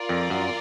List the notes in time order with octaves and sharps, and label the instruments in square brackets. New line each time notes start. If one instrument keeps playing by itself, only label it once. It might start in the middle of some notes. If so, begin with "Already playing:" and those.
Already playing: [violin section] F4 A#4 D5
[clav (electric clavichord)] F2
F#2